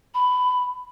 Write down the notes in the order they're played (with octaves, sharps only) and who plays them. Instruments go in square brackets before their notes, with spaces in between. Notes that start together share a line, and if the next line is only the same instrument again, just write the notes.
[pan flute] B5